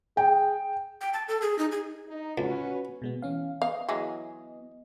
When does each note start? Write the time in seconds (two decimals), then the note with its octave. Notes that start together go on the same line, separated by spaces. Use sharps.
0.17 G#4 G5
1.01 G5
1.13 A5
1.28 A4
1.42 G#4
1.59 D#4
1.72 G#4
2.08 D#4
2.38 C#2 C#4 F#4 B4
3.02 B2 G#3 B3
3.22 E3 C#4 F5
3.62 B3 D#5 F5
3.88 E3 F#3 G#3